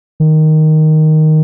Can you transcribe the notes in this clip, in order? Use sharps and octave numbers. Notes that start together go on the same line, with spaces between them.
D#3